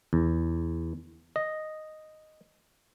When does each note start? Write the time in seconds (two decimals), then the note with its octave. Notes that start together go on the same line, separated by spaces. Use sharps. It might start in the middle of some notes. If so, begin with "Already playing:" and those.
0.13 E2
1.36 D#5